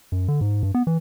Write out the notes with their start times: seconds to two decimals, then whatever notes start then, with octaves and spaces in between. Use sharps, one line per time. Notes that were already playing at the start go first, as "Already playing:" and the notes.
0.12 F#2
0.28 D3
0.41 G#2
0.63 G2
0.75 B3
0.87 E3